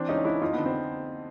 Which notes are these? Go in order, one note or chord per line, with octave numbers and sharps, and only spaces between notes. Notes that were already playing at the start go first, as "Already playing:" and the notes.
Already playing: E3 C4 D4
C#2 C#4 D#4
C#2 D4 E4
F2 D#4 F4
D3 B3
C4